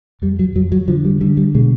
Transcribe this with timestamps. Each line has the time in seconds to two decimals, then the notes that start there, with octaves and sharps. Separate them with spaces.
0.22 F2 G3
0.39 F#3
0.55 F2 F#3
0.72 F#3
0.88 D3 F3
1.05 G3
1.21 D3 G3
1.37 G3
1.55 B2 G#3